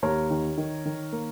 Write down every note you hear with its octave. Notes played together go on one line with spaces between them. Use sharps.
D#2 A#4 C#5
D#3
D#3
D#3
A#3